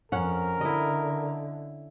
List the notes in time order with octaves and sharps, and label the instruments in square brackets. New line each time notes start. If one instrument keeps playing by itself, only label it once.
[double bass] F2 [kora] C#4 F#5 [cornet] A#4
[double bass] D3 [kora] E4 D#5